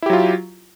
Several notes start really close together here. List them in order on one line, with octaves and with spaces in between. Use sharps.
E4 G4 F#3 F4